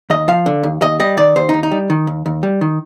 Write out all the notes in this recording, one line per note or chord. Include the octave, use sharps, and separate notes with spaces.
D#2 D#5
F3 F5
D3
D#2
D#2 D#5
G3 D#5
D#3 D5
D#2 C5
D#2 D#4
D#4
G3
D#3
D#2
D#2
G3
D#3